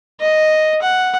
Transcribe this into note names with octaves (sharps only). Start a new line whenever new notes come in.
D#5
F#5